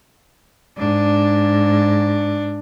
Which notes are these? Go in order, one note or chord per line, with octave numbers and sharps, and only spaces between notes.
G#2 D4